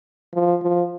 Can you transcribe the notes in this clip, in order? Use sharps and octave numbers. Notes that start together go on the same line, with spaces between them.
F3
F3